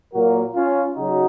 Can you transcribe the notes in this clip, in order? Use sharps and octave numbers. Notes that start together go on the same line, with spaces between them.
A#2 F#3 A#3 F#4 A#4
C#4 F4
C#3 F#3 D#4 F#4